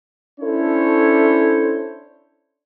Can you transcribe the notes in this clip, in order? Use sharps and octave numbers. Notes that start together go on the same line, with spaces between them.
C#4 D4 E4 A4 C5 C#5